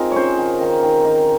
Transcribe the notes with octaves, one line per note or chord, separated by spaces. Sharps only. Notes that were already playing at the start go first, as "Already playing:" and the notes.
Already playing: C4 D#4 F4 G#4 A#4
C#4 C5 C#5
D#3
D#3
D#3
D#3